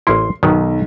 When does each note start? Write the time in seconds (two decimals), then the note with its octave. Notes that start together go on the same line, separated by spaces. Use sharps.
0.07 A1 A#3 E4 C6
0.43 B1 D#3 F#3 B3